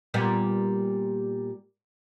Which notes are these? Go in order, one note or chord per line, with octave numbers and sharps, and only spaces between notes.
A#2 G3 B3